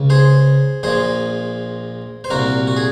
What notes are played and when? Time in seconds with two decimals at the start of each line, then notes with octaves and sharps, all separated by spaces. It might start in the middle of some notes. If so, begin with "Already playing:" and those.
Already playing: C#2 C#3
0.10 G#4 C5
0.83 A#1 A#2 G#4 C5
2.24 C5
2.30 C2 A#2 F#4 A#4
2.67 F#4
2.76 G#4